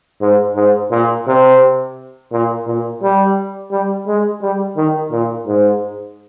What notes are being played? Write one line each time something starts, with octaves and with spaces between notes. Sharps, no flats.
G#2
G#2
A#2
C3
A#2
A#2
G3
G3
G#3
G3
D#3
A#2
G#2